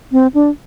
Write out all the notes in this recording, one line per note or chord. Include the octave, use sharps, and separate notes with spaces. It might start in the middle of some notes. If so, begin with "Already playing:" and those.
C4
D4